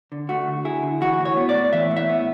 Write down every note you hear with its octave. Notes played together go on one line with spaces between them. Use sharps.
D3
A3 F#4
D3
E4 G#4
D3
E3 F#4
A2
C#5
B3
D5
A2
E3 E5
A2
E5
B3